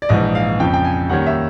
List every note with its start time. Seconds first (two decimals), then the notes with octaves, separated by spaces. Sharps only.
0.02 D5
0.09 A#1 G#2 E3 D#5
0.35 F5
0.60 F2 C#3 F3 G5
0.74 G5
0.84 G#5
1.10 D#2 D#3 G3 A#3 C#4 F#5
1.27 E5